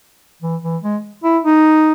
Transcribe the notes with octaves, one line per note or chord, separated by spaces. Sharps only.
E3
E3
G#3
E4
D#4